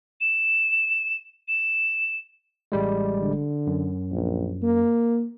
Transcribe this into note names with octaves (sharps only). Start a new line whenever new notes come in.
E7
E7
A1 G3 G#3
D3
F#2
A#1
A#3